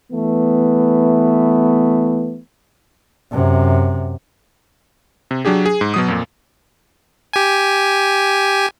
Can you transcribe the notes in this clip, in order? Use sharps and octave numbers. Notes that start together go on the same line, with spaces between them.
E3 A3 B3
F#2 C3
C3
F#3 D4 G4 G#4
G#4
G#2
B2 F#3 D#6
F2 A#2
G4 G#5